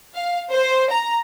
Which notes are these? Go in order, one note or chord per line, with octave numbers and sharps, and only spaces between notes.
F5
C5
A#5